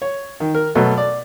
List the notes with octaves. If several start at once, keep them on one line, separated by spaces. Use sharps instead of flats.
C#5
D#3
A#4
B2 F#3 A3
D5